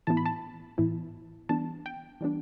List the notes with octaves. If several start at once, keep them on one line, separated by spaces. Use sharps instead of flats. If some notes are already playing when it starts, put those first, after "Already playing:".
A2 E3 B3 E4 A5
B5
A5
A2 E3 B3 E4
E3 G3 B3 D4 A5
G5
E3 G3 B3 D4